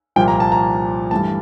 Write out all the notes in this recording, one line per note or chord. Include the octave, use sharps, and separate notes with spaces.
C2 A#2 F3 A#3 G5
A#5
A5
A#5
G2 E3 A3 A5